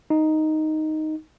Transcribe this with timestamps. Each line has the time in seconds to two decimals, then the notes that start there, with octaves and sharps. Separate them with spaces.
0.10 D#4